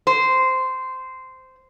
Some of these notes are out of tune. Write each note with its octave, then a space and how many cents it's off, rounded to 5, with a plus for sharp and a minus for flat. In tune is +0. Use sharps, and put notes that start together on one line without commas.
C5 -10